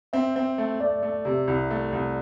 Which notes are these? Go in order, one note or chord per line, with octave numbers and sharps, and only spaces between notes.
C4 E5
C4
A3
A3 D5
A3
C3
C2
A3
C2